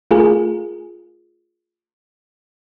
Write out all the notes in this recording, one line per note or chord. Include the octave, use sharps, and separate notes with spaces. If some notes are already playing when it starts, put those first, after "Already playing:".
A3 F4 G#4 A#4